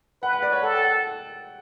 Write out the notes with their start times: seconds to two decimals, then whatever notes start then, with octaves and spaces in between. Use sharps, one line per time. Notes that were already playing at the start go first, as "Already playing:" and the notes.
0.22 B4 F#5
0.33 F#5
0.43 D5
0.52 C#5
0.63 A4 F#5
0.73 G5
0.82 F#5